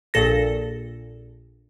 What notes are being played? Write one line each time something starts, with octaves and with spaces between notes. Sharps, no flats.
A#1 A#2 A4 A#6